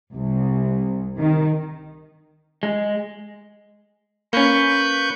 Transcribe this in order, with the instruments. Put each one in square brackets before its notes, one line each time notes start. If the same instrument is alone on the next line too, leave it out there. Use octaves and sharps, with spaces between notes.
[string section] C2
D#3
[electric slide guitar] G#3
[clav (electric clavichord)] A#3 C#4 [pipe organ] B4 C#6 G6